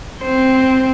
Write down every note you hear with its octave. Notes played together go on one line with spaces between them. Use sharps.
C4 C5